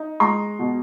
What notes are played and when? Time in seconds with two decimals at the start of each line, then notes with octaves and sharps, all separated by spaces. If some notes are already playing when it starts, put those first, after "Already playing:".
Already playing: D#4
0.20 G#3 A#5 C6
0.59 B2